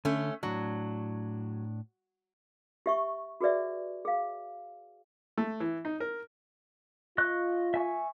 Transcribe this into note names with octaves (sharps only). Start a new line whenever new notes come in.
D3 A3 C#4
A2 F#3 D4
G4 E5 C#6
F#4 G#4 B4 D5 E5
G#4 F5
A3
E3
D#4
A#4
F4 D#5 C#6 F#6
E5 G#5 C#6